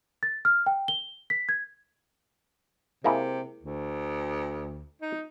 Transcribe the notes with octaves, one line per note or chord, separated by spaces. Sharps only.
A6
F6
G5
G7
B6
G#6
C3 G#3 A#3 E4
D2
D#4